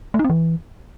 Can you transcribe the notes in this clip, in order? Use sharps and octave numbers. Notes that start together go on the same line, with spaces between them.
A3
D#4
C4
E3